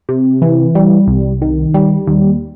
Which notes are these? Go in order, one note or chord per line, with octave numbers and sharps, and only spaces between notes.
C3
E3
G3
C2
D#3
G3
D#2